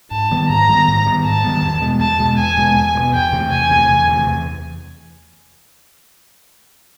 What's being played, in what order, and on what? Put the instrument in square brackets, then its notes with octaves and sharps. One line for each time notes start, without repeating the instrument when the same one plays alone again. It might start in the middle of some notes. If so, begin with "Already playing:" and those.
[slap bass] G#2 [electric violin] A5
[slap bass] D#3 G3 B3
[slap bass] G#2 [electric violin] A#5
[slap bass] D#3 G3 B3
G#2
D#3 G3 B3
[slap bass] G#2 [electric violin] A5
[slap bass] D#3 G3 B3
E2
B2 G#3 B3
[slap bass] E2 [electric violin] A5
[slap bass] B2 G#3 B3
[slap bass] E2 [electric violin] G#5
[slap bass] B2 G#3 B3
E2
B2 G#3
B3
[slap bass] E2 [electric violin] G5
[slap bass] C3 E3 A3
[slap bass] E2 [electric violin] G#5
[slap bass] C3 E3 A3
E2
C3 E3 A3
E2